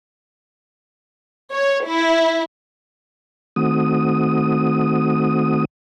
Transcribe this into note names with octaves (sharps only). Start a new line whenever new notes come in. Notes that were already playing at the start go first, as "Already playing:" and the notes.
C#5
E4
D#3 A3 C4 F#4 D#6